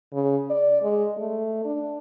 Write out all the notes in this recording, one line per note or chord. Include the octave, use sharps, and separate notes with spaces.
C#3
D5
G#3
A3
D4